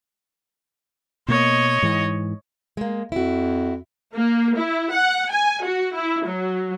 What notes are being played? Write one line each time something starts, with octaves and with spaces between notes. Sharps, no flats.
B2 A#3 C#5 D#5
G#2 E3
G#3 A#3
F2 E4 F#4
A#3
E4
F#5
G#5
F#4
E4
F#3